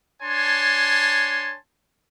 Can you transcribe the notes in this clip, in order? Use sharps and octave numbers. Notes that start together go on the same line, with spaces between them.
D4 C#5 G#5 A5 C6